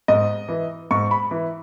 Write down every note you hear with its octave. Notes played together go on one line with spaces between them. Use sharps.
G#2 D#5
E3
G#2 C#6
B5
E3